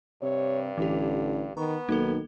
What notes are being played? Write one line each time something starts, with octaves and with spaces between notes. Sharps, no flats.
G2 C3 C#5
A1 D3 E3 G4
D#3 B3 A#5 C#6
B1 D#3 A#3 A4